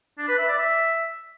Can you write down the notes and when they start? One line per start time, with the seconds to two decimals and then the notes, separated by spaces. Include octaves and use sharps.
0.18 D4
0.28 B4
0.38 E5
0.48 D5
0.58 E5